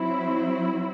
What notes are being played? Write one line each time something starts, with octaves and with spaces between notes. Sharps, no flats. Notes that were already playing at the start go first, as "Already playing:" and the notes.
Already playing: F#3 C4 E4